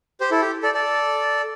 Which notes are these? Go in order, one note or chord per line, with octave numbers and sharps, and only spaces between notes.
G4 C5
E4 A4
G4
A4 D5
A4 D5